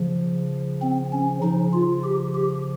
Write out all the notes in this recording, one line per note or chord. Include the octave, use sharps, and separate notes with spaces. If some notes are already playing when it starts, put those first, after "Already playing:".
Already playing: C#3 F3
C4
C#4
C#3 F3 D#4
F4
G4
G4